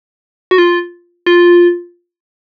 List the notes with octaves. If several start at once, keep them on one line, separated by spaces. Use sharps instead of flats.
F#4
F4
F4